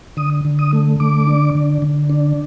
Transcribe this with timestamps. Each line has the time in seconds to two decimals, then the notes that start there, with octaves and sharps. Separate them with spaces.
0.17 D3 D#6
0.45 D3
0.59 D#6
0.73 A3
1.00 D3 D6
1.27 D4
1.55 D3
1.82 D3
2.10 D4